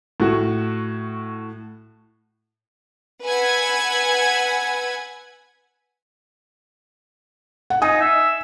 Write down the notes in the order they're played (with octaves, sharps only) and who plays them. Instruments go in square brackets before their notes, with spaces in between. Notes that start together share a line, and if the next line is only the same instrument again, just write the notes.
[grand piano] A2 F#4
[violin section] B4 F#5 G#5 B5 E6 G#6
[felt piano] F#5
[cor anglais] D#4 [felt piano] G#5 D#6
[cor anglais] E5